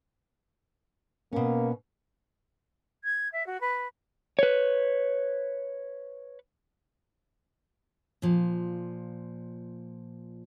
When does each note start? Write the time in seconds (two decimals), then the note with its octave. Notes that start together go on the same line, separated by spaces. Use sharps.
1.33 B2 A#3 C#4
3.04 G#6
3.32 E5
3.46 F#4
3.60 B4
4.39 B4 C#5
8.22 A#2 F3